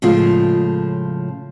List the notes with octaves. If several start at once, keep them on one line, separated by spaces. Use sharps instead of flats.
A2 C#3 F3 G#3 F4